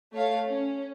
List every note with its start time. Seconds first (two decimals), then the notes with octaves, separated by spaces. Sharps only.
0.13 A3 C#5 F5
0.46 C#4